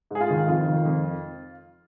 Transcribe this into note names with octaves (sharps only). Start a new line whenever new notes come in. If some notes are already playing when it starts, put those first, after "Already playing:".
G#2 G#4
F4
D#3
F2 F4
D#3
F2